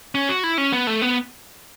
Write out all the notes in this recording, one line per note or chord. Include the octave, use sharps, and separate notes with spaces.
C#4
F#4
E4
C#4
B3
A3
B3